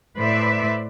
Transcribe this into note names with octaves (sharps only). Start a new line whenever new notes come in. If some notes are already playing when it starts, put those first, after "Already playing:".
A2 B4 C5 D5 E5